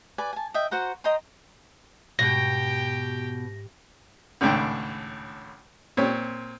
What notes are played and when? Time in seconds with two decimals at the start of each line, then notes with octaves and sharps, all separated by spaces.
0.18 B4 D5 G#5
0.33 G#5 A5
0.54 D#5 E5 G5
0.71 F#4 C5 F#5 A#5
1.04 D#5 G5 A#5 C6
2.19 G#2 B2 G4 G5 A#6
4.41 G#1 C#2 A2 D4 G5
5.97 A#2 C4 C#5